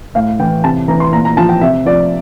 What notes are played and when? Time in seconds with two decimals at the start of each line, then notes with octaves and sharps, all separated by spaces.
0.15 A2 F5
0.39 E3 G5
0.63 C3 A5
0.88 E3 A#5
1.00 C6
1.13 A#2 A#5
1.25 A#5
1.37 F3 A5
1.49 G5
1.61 C3 E5
1.85 F3 D5